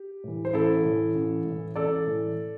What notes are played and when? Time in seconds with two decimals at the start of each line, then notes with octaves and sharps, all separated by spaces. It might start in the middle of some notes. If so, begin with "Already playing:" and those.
Already playing: G4
0.24 A2 E3
0.45 C5
0.53 A1 E4 A4
0.85 A2 E3
1.15 A1
1.45 A2 E3
1.76 A1 A4 D5
2.06 A2 E3